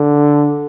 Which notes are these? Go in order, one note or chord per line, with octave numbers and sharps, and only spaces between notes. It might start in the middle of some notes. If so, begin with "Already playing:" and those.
Already playing: D3